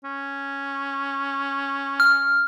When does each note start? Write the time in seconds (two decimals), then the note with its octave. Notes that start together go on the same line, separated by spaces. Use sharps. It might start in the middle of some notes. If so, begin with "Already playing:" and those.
0.04 C#4
2.00 F6